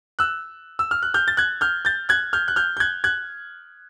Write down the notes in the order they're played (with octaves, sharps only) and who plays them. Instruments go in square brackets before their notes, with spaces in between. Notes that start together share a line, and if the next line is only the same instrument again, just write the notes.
[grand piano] E6 F#6
E6
F6
F#6
F6 G6
A6
F#6 G#6
F6 G6
G6 A6
F#6 G#6
F6 G6
F#6
F6 G6
G6
F#6 G#6
F#6 G#6